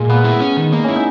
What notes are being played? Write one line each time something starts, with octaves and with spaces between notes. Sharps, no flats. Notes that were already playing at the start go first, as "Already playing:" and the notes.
Already playing: A#2 G#3
A#3 B3
E4
C#4
D#3
A#3 D#4
C#4 E4
D#4